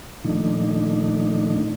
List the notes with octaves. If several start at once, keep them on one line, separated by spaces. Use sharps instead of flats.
A#2 D#3 F3 A3 D4 D#4